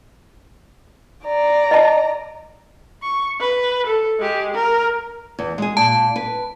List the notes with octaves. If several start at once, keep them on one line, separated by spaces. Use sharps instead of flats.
D5 A#5
D#5 A5
C#6
B4
A4
G#3 G4
A#4
E2
G#3 G#4
A#2 A5
B4